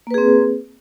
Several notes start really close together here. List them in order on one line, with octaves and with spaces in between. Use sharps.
A#3 B4 G#4 C4